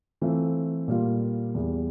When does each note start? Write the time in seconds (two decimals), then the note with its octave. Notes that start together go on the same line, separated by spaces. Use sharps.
0.21 E3 A3 C4 F4
0.88 A#2 G3 A#3 F4
1.54 E2 E3 G3